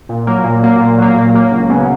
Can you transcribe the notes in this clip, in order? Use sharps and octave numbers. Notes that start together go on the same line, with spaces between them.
A#2
F#3 A#3
A#2
F#3 A#3
A#2
F#3 A#3
A#2
F#3 A#3
C#2
C#3 F#3 B3